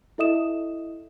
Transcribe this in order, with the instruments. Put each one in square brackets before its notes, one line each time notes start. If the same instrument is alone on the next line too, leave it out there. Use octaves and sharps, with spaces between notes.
[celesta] E4 A4 D#5 E5 D#6 E7